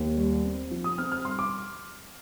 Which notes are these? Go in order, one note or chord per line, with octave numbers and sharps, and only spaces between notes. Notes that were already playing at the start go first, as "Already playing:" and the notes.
Already playing: D#2
G3
C4
F3
D#6
C4 F6
F6
G3 C6
D6